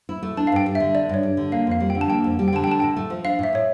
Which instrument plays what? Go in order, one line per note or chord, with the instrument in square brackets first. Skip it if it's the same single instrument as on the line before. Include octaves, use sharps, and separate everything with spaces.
[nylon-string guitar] E4
A3
[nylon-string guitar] D4 [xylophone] A5
[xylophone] F5
[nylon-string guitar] G2 [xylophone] G5
[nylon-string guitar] G3
[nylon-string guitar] D3 [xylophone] E5
[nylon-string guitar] D4 [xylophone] D5
[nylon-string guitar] G2 [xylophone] C#5
[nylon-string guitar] G3
D3
[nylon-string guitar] A#3 [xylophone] F5
[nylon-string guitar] F2 [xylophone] F5
[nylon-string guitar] G3
[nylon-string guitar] D3 [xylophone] G5
[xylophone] A5
[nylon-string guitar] A#3 [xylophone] G5
[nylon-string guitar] F2
G3
[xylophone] G5
[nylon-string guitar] D3 [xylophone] A5
[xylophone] G5
[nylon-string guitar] D4 [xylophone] A5
[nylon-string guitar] A2 [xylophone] G5
[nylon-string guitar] A3
F3
[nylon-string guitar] D4 [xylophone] F5
[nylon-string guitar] A2 [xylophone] E5
[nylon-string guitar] A3 [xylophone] C#5